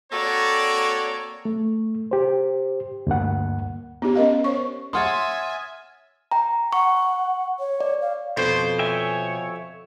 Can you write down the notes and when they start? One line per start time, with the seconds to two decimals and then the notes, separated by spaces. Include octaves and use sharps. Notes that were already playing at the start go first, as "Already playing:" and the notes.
0.12 A#3 C4 F#4 A4 C#5 D5
1.45 A3
2.11 G4 C5
3.07 D2 G2 A#3 F#5
4.02 B3 D#4 G4
4.16 C#4 A#4 D#5 F5
4.44 C5 C#5 C#6
4.93 C#5 E5 F#5 G#5 C6 D#6 F6 A6
6.31 G5 A#5
6.73 F#5 C#6
7.60 C#5
7.81 D5
8.01 F5
8.37 F2 B2 C5
8.79 C#5 E5 G5 G#5